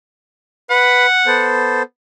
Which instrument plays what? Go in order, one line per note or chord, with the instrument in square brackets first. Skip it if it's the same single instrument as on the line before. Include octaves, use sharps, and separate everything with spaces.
[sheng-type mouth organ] B4 B5 [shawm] F#5
[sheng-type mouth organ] B3 A4 C5